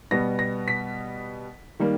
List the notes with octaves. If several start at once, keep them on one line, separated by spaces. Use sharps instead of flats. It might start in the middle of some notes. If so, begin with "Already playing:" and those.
B2 G3 B3 A#6
A#6
B6
D#3 G3 A#3